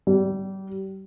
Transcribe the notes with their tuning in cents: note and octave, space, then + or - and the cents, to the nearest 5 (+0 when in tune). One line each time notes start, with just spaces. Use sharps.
G3 -30